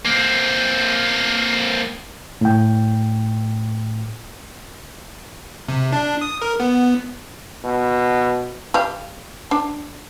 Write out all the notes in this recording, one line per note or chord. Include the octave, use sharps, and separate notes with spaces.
A#3 C4
A2 G5
C3
D4
D#6
A#4
B3
B2
G4 F5
D4